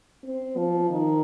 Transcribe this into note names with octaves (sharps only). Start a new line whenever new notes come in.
C4
F3
D#3